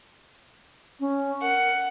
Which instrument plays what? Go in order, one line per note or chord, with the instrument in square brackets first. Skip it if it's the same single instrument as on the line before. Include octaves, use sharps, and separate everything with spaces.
[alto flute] C#4
[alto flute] A#4 [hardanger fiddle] F#5